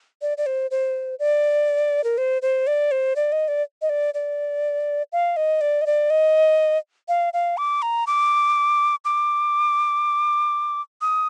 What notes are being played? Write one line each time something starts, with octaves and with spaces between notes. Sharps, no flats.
D5
D5
C5
C5
D5
A#4
C5
C5
D5
C5
D5
D#5
D5
D#5
D5
D5
F5
D#5
D5
D#5
D5
D#5
F5
F5
D6
A#5
D6
D6
D#6